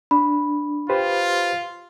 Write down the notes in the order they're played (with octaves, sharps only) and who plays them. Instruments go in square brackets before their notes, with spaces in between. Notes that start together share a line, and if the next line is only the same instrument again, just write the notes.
[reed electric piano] D4 [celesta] B5
[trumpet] F4 [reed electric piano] G4 B4 C5